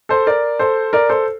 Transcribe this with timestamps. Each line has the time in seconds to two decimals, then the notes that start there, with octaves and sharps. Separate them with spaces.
0.09 A4 C5
0.27 A#4 D5
0.59 A4 C5
0.93 A#4 D5
1.09 A4 C5